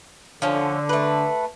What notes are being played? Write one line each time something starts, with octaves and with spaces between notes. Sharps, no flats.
D3 F3 C#4
A3 B4